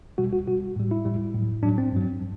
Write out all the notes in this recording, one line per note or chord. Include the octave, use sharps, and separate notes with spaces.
B2 G3 F#4
F#4
B2 G3 F#4
A2 G3
E4
A2 G3
A2 F#3
A2 F#3 D4
C4
G2 F#3
F#3